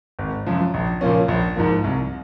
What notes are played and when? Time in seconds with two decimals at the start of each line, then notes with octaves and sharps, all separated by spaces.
0.19 G#1
0.46 F#2 F3
0.74 A#1
1.01 A#2 F3 A#3 C#4
1.28 A#1
1.56 G#2 F3 A#3
1.84 C2